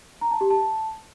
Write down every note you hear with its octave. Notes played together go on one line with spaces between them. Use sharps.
A#5
A5
G4
A5